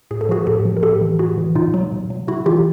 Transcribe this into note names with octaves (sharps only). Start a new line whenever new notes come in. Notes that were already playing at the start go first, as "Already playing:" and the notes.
A2 G#4
A4
F3 F#4 G#4
A2 G4 A4
F3
A#4
A2 G4 A4
E3
A2 F#4 G#4
E3
B2 D#4 F4
F#3
B2
F#3
C3 E4 F#4
E3 F4 G4